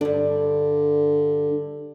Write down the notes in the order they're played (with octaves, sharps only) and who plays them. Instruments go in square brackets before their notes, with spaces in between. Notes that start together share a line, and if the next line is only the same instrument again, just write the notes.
[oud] G2 D4 [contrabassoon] D3